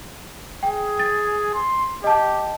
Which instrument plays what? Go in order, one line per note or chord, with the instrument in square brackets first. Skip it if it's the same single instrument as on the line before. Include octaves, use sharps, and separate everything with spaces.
[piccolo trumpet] G#4 [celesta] G5
[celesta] A6
[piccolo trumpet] C6
[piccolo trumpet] G4 [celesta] D#5 A5